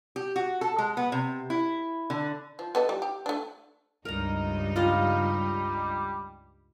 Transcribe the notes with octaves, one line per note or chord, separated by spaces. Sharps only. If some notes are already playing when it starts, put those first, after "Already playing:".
G4
F#4
A4
G#3
B3
C3
E4
D3
F3
B3 A4 D#5
G3
G4
A3 D4
C#2 G2 D#4 A#4 A#5
G3 F4 D#5 F5